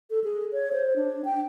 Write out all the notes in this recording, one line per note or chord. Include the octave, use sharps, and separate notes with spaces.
A4
G#4
C#5
C5
D4
G5